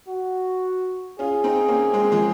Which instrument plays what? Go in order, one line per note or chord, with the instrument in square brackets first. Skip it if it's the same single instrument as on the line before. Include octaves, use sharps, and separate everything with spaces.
[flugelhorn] F#4
[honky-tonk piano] C#4 F4 [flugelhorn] G#4
[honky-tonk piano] C4 D#4
A#3 C#4
G#3 C4
F3 G#3